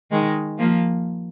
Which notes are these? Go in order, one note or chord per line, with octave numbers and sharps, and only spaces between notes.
D#3 G#3
F3 A#3